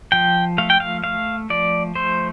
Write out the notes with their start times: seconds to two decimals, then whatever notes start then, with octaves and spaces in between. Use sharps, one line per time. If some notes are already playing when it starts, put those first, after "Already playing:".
0.12 F3 G5
0.58 A3 F5
0.70 G5
0.80 F5
1.04 A3 F5
1.50 F3 D5
1.95 A3 C5